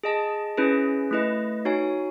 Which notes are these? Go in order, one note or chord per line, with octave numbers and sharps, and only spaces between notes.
G#4 D#5 A5
C#4 E4 G#4 B4
A3 E4 B4 D#5
D#4 F#4 C#5 G#5